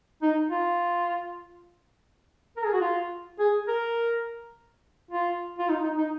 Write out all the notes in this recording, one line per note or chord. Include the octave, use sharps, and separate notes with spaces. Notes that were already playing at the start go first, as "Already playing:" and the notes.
D#4
F4
A#4
G#4
F#4
F4
G#4
A#4
F4
F4
D#4
D#4
D#4